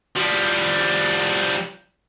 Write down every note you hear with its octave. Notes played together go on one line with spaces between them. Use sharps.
F3 G3